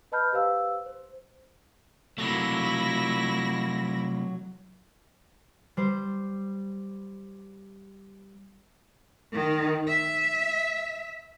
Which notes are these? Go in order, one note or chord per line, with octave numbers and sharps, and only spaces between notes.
B4 D#5 A5 B5 F6 G6
G4 B4 C5 F5 E6
C5
C3 F#3 A3 A#3 E4 A#6
G3 C5
D#3
E5